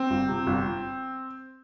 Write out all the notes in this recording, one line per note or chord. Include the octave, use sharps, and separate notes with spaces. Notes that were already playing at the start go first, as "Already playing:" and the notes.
Already playing: C4
G1
C3
G1